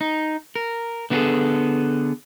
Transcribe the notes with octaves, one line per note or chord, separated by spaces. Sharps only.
D#4
A#4
D3 B3 E4 F#4 G#4 A4